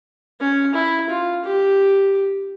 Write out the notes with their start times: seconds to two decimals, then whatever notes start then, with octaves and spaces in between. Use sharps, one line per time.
0.40 C#4
0.75 E4
1.09 F4
1.44 G4